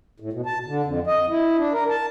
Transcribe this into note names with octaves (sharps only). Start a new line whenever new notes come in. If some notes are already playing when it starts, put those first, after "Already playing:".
A2
B2
A5
D3
F2
D#5
E4
D4
A#4
A5